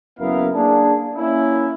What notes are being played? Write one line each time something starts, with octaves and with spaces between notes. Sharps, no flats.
F#1 F#2 B3 E4 A#4 F5
A#3 D4 G#4
A#3 C#4 E4